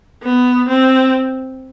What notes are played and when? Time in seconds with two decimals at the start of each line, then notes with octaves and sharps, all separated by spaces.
0.23 B3
0.69 C4